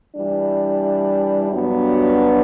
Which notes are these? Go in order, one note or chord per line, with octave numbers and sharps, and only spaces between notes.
E3 G3 D4
G2 F#3 B3 D4 F#4